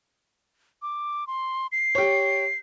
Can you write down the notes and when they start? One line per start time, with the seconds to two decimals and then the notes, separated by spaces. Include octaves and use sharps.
0.82 D6
1.27 C6
1.72 C7
1.95 G4 C#5